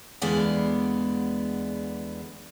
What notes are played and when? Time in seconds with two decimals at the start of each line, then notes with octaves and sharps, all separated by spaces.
0.22 E2 D3 G#3 B3 D5 F5